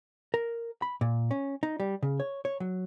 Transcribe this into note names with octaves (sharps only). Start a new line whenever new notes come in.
A#4
B5
A#2
C#4
D#4
G3
C#3
C#5
C#5
F#3